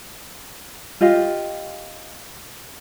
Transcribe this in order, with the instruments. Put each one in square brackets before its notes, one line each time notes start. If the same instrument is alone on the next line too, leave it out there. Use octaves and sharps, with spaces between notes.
[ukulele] F4 G4 D#5 F5